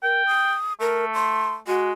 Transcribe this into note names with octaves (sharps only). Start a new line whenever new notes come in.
A#4 G5
D#6
A3 A#4
C6
G#3 F#4